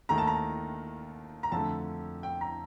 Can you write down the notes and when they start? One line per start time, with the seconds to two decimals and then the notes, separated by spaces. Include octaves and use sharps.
0.09 D#2 D#3 A3 A#5
0.18 A5
0.27 A#5
1.43 A#5
1.52 F2 D3 A3 A5
2.23 G5
2.41 A#5